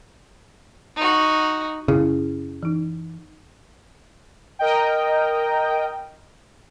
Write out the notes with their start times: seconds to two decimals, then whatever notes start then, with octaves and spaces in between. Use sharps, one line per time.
0.96 D#4 F#4
1.88 F#2 C#3 E4
2.63 E3 D#4
4.59 A#4 D#5 G5